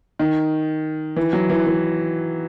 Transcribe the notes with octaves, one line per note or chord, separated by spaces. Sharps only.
D#3
E3
F#3
E3
E3